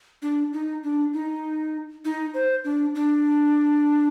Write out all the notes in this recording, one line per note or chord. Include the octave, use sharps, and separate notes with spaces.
D4
D#4
D4
D#4
D#4
C5
D4
D4